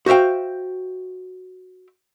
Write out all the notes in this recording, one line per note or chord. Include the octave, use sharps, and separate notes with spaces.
F#4 C5 E5 F5 G5